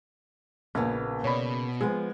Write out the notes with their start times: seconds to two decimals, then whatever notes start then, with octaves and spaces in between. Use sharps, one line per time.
0.75 A#1 C#3 A#3 B3
1.24 B2 C#5 D5 B5
1.81 F3 G#3 B3